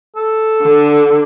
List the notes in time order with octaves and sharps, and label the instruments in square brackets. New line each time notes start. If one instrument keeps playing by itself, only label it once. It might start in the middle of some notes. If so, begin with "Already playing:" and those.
[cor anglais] A4
[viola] D3